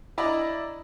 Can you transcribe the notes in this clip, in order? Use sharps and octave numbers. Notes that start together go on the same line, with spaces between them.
D4 E4 D5 D#5 A#5 B5